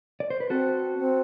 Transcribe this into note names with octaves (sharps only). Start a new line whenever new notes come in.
D5
C5
B4
C4 F#4 A4
C4